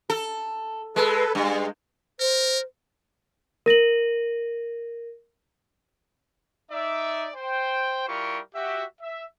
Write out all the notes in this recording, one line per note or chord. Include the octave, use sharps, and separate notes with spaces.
A4
G#3 A4 B4
G2 G#3
A#4 C5
A#4 A#6 D#7 F#7
D#4 D5 E5
C5 G5
G3 E4 F4 G4 A#4 C#6
F#4 G4 E5
E5